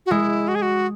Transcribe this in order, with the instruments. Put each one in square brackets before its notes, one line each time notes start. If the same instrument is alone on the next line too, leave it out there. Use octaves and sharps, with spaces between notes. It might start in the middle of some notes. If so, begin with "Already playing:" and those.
[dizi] F#4
[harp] G#3 [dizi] E4
[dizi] F#4
G#4
F#4